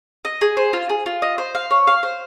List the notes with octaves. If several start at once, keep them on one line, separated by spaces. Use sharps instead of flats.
D#5
G#4
C5
F4
G#4
F4
D#5
C5
F5
C#5
F5
C5